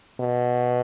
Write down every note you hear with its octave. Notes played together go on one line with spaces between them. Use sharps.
B2